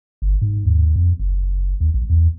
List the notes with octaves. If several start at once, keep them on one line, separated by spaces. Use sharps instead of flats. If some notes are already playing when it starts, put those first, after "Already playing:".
G1
G#2
D#2
F2
F#1
D#2
A#1
E2